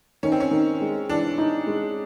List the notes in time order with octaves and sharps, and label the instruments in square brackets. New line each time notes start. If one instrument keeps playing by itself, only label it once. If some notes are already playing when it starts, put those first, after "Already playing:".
[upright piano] D#3 [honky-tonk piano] C#4
[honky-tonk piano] C4
C#4
[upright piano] D#3
G#3
[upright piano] E3 [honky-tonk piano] D4
[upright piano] D#4
G#3